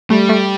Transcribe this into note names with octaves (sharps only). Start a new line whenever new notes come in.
G3 A3
A3